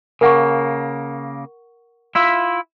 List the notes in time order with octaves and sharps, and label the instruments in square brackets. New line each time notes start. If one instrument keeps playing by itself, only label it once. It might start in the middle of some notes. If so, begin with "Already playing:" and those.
[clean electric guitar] C#3 A#3 [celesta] A#4 F#5 C#6
[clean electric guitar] E4 F4 E5